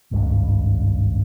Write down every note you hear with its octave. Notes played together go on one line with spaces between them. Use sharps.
G#1 C#2 G2 C#3